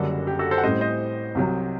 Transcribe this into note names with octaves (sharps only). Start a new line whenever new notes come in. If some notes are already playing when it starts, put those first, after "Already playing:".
Already playing: F#1 F#2 D3 G3 D4 F#4 A4
G4
F#4 A4
A4 C5
F#5
A1 A2 G3 C4 C5 D#5
C5 D#5
C2 C3 F#3